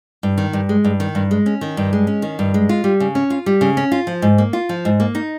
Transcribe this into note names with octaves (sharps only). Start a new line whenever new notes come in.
G2
D#3
G2
G#3
G2
D#3
G2
G#3
C#4
D#3
G2
G#3
C#4
D#3
G2
G#3
F4
G3
C#3
C#4
F4
G3
C#3
C#4
F4
F3
G#2
A#3
F4
F3
G#2
A#3
D#4